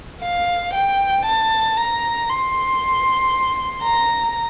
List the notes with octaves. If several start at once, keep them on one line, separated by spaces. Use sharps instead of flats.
F5
G5
A5
A#5
C6
A#5